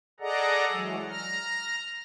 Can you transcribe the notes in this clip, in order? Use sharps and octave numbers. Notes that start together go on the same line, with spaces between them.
G#4 A4 D5 D#5 F#5 A#5
E3 F#3 G#3
A#5 F6